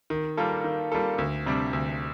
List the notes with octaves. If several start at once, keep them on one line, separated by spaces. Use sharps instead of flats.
D#3
G3 A#3 F4 A4
D#3
G3 A#3 F4 A4
D2
C3 G3 D4
D2